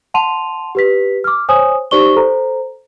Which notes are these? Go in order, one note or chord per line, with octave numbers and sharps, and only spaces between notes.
F#5 A5 C6 D#7 F7
G4 B4 B6
D6 F6
C5 C#5 G#5 D#6
D#4 G4 C5 D5 C#6 G7
A4 C5 A#5